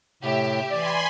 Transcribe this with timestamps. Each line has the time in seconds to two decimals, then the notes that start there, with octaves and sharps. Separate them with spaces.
0.23 A2 C3 G4 E5
0.71 E3 D5 G#5 B5 C6